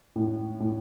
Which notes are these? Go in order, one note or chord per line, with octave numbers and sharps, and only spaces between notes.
A2
A2